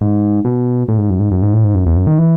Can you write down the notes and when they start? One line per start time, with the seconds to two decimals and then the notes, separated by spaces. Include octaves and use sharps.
0.01 G#2
0.45 B2
0.88 A2
0.98 G#2
1.10 F#2
1.20 G#2
1.31 F#2
1.42 G#2
1.53 A2
1.64 G#2
1.75 F#2
1.86 E2
1.96 F#2
2.07 D#3
2.18 E3